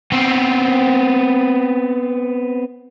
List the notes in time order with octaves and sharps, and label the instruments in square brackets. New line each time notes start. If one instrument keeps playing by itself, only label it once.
[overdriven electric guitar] B3 C4